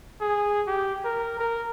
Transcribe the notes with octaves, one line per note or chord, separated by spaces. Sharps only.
G#4
G4
A#4
A#4